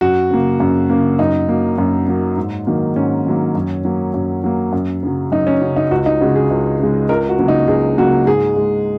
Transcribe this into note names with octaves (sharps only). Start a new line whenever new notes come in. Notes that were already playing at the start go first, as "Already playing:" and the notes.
F#2 F#4
C#3 A#3
F#2
C#3 A#3
F#2 D#4
F#3 A#3
F#2
F#3 A#3
G#2
D#3 F#3 A#3
G#2 C#4
D#3 F#3 A#3
F#2
F#3 A#3
F#2
F#3 A#3
F#2
C#3 F#3
F#2 D#4
C#4
C#3 F#3
D#4
C#2 F#4
D#4
C#3 G#3 F#4
G#4
C#2
C#3 G#3
C#2 A#4
F#4
C#3 F#3 A#3
D#4
C#2 G#4
C#3 F#3 A#3 F#4
G#2 G#4
G#3